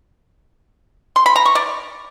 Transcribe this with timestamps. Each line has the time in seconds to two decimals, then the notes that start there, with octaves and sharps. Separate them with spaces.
1.16 C6
1.26 B5
1.36 A#5
1.45 C#6
1.55 D5